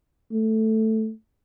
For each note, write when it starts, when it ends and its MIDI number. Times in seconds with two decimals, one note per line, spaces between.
0.32 1.11 57